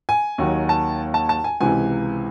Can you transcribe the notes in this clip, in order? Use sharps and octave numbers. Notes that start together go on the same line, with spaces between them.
G#5
D#2 D#3 F#3
A5
A5
A5
G#5
C#2 C3 E3 G#5